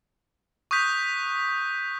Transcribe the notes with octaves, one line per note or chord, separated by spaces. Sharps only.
C#6 D#6 F#6 G6 B6